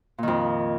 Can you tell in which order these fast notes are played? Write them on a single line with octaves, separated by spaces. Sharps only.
A#2 D#3 F2